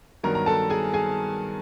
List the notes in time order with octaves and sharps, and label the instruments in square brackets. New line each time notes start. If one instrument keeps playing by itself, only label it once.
[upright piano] G2 D#3 F#3 B3 A#4 A#5
A#5
A4 A5
G#4 G#5
G#4 G#5